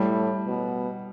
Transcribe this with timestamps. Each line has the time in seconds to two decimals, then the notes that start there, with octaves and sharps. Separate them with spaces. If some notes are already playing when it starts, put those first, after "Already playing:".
Already playing: A2 G3
0.47 B2